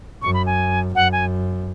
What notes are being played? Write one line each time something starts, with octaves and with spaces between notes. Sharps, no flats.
F#2 C#6
B5
G#5
F#2 F#5
G#5